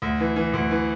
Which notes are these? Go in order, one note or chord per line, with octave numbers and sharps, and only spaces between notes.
D2
E3
E3
D2
E3